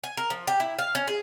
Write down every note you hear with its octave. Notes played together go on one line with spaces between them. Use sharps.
G#5
A#4
F3
G4
E4
F5
C#4
G#4